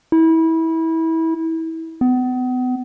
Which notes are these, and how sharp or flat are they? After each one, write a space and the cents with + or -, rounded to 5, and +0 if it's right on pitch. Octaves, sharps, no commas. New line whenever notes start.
E4 -25
B3 +35